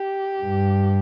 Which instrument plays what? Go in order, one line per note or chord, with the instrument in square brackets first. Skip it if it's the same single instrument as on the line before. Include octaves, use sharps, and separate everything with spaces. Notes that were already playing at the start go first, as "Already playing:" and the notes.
Already playing: [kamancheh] G4
[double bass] G2